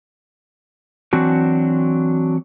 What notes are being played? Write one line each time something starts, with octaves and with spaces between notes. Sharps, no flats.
E3 F#3 C4 D4 F#4